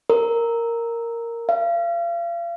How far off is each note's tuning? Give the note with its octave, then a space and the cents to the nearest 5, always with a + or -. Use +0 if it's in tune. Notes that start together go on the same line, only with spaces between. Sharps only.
A#4 -5
F5 -35